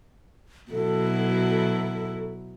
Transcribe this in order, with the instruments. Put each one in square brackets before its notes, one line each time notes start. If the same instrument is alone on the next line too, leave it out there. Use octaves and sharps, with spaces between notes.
[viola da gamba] B2 F#3 E4 [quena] A4